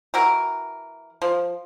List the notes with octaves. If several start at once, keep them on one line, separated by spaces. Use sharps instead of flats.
E3 F#4 A#4
F3